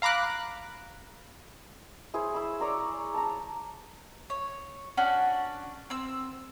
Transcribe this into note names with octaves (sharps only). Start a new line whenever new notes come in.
F5 A#5 B5 D6 F#6
E4 G#4 C5 C#5
B5 E6
C#5 D5 A#5 C6
A5 A#5
C#5
C#4 D4 F#4
C4 E6